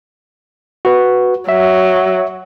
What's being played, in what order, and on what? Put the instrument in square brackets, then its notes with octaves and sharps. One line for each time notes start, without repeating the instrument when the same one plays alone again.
[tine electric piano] F#4 B4
[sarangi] F#3 [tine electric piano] E5